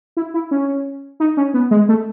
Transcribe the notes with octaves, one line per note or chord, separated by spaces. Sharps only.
E4
E4
C#4
D#4
C#4
B3
G#3
A3